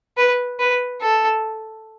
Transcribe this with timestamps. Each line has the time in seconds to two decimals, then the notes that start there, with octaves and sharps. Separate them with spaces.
0.17 B4
0.59 B4
1.01 A4